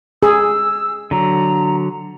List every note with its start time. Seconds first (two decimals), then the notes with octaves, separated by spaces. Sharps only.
0.23 G#4 E6
1.11 D3 F#3 A#5